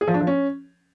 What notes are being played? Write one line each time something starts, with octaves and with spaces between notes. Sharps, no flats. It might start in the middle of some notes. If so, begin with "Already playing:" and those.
G#4
F3
D4
F3
C#4